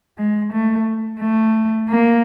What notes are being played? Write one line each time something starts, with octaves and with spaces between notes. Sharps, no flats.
G#3
A3
A3
A#3